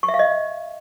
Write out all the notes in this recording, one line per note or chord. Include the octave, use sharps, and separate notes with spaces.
C#6
E5
F5
D#5